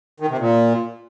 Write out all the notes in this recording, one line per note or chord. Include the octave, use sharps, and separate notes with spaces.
D#3
C3
A#2